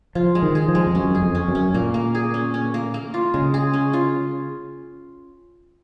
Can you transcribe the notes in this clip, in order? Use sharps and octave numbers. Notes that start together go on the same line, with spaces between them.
F3 F4
G#3
D#3
G#4
F3
G#3
F2
F#2 C#4
G#4
F2
C#4
F#2
C#4
A#2 A#3
A#3
G#4
C#4
C#4
A#3
A#3
F4
C#3 G#3
G#4
C#4
F4